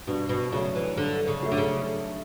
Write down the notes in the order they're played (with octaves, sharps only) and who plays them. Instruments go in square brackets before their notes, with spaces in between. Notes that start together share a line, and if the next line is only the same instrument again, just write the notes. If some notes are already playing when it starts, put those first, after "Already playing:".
[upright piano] G2 [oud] B2
[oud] B2
[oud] C#3 [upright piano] F#3 A3
[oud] E3
[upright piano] G2 [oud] D3
[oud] C#3
[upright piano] F#3 A3
[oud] D3
C#3